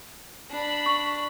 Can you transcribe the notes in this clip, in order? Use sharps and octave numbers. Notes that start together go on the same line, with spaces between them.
D4 B5
C#6